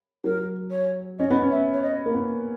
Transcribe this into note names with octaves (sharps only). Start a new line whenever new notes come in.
F#3 A#4
C#5
C#4 D#5
B3
C#4
E5
C#5
D#5
A#3
B3